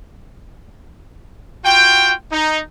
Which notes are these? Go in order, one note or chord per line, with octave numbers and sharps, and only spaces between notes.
F4 F#4 G5
D#4